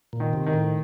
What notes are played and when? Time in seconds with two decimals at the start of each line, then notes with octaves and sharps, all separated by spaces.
0.13 A#2
0.20 D#3
0.33 C3
0.46 D#3
0.53 A2